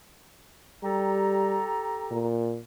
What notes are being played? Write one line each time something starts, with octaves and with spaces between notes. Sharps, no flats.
G3 G4 A4 A#5
A#2